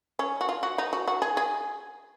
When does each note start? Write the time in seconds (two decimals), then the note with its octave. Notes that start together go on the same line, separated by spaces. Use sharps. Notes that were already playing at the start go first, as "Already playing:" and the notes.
0.19 C#4
0.41 F#4
0.49 F4
0.63 F#4
0.78 D#4
0.93 F#4
1.08 F#4
1.22 G#4
1.37 G#4